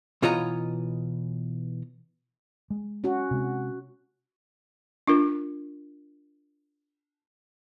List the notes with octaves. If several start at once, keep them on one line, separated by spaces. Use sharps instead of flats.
B2 E3 F4 C#5 D#5 A#5
G#3
C#4 F#4
C3 G#3
D4 F4 A#4